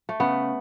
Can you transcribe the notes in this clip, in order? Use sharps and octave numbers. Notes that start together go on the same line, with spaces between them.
A3
C#3 B3